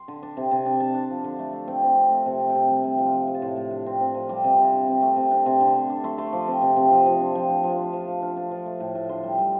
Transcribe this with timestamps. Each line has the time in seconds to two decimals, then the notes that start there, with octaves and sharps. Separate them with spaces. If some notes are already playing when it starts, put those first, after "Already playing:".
Already playing: C6
0.08 D3
0.23 D4
0.37 C3
0.51 C3
0.66 D4
0.80 D4 A5
0.94 D4
1.10 F3
1.24 D3
1.39 A3
1.53 A3
1.68 C4 G5
1.83 C4
1.96 C4
2.11 A3
2.26 C3
2.40 A3
2.49 G5
2.55 C3 A5
2.69 G3
2.84 C3
2.99 F3
3.13 F3
3.27 F3
3.35 A5
3.42 A2 C6
3.57 A2
3.71 D4
3.86 C4
4.00 C4
4.14 F3
4.29 G3 D6
4.44 C3
4.58 C3
4.73 D3
4.88 C4
5.02 A3
5.17 C3
5.31 D4
5.46 C3
5.61 D3
5.75 D3
5.90 D4
6.04 A3 C6
6.18 A3 C6
6.33 F3 D6
6.48 C4 C6
6.62 C3
6.76 C3
6.91 F3
7.06 F3
7.20 D4
7.35 F3 G5
7.49 D4
7.64 F3
7.78 D4
7.93 F3
8.08 F3
8.22 D4 F5
8.37 D4
8.51 F3
8.66 A3
8.80 A2
8.95 A2
9.09 D3 C6
9.24 G3
9.38 G3